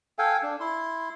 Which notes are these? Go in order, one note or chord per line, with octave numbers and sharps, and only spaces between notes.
A4 F5 G5 G#5
D4
E4 C6